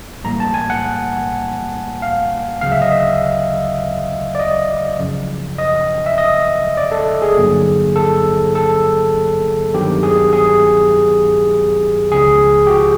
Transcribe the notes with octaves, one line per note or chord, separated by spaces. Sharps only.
B1 A2 E3 G3 A#3 A#5
A5
G#5
F#5
F5
D2 C#3 F#3 F5
E5
D#5
E5
D5
D#5
F#2 C#3 F3
D#5
E5
D#5
D5
A4
G#4
G2 D3 F#3 A#3
A4
A4
G2 D#3 F#3 B3 G4
G#4
G#4
C#2 C#3 F3 G#4
G4
F#4